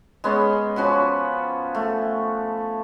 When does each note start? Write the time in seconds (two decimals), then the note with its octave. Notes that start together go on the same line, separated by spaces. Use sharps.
0.24 G#3 B3 C#4
0.76 F3 C#4 F#4 B4
1.75 A3